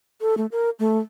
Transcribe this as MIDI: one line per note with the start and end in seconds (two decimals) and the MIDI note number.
0.21 0.35 69
0.38 0.46 57
0.52 0.70 70
0.79 0.99 57